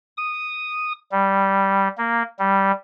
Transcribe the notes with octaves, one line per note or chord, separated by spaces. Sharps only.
D#6
G3
A#3
G3